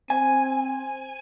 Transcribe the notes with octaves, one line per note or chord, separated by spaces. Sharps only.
C4 G#5